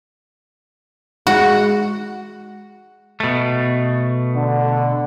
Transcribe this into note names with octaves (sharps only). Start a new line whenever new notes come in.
G#3 F#4
B2 A3
D3